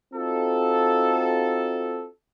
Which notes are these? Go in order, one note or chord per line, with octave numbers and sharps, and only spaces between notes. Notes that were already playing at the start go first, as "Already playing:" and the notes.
C4 D#4 F4 F#4 A4